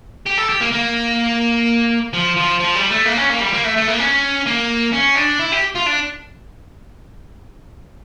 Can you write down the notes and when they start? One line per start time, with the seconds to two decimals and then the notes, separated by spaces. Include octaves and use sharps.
0.26 G4
0.37 A4
0.49 G4
0.61 A#3
0.73 A#3
2.13 F3
2.36 F3
2.60 F3
2.75 G3
2.91 A3
3.06 A#3
3.18 C#4
3.30 A#3
3.41 G3
3.53 A#3
3.65 A3
3.77 A3
3.88 A#3
4.00 C#4
4.47 A#3
4.93 C#4
5.16 D4
5.39 E4
5.52 G4
5.75 F4
5.86 D4